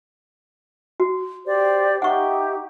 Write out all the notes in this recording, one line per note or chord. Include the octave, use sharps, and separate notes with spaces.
F#4
G4 C5 D5
D#4 G4 E5 F#5 C#6